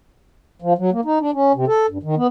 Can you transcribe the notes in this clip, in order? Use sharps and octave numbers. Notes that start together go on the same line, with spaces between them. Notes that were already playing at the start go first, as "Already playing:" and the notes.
F3
F#3
A#3
D#4
D4
C#4
C3
A4
G2
D#3
B3